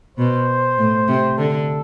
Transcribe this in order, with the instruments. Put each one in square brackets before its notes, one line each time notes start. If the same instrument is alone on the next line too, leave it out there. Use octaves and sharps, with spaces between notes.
[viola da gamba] B2 [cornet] C5
[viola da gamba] A2
C3
[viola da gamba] D3 [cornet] A4